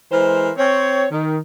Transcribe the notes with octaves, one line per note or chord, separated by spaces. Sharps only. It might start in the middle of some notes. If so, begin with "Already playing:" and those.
E3 G#3 A#4 C5
C4 C#5
D#3